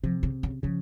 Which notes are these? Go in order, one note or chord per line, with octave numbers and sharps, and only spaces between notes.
C3 F3
C#3
C#3
C#3 F3